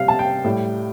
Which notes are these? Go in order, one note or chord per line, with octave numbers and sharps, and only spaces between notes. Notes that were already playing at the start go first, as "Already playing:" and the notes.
Already playing: C3 G3 F5
A5
G5
A2 G3